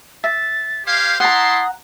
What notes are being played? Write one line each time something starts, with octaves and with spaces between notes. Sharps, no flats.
E5 A6
G4 C5 F5 G#6
E4 F#5 A5 A#5 C6 D#6